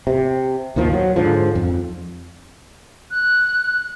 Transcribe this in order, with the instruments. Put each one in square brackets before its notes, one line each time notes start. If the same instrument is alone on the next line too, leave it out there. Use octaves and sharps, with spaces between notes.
[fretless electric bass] C3
D#2 A#2 D#3 F3
F#3
G#2 D3 F3
F2
[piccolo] F#6